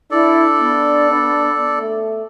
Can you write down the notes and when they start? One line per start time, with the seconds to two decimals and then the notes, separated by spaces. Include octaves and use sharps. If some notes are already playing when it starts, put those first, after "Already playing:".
0.11 D4 E4 A4 D5
0.59 B3
1.11 D4
1.79 A3